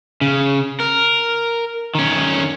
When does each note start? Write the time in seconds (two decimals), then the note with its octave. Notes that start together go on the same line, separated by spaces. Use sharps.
0.21 C#3
0.80 A#4
1.95 D#3 C#4